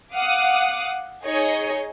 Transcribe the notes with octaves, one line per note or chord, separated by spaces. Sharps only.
F5 F#5 D6 D#6
D#4 G#4 C#5 D#5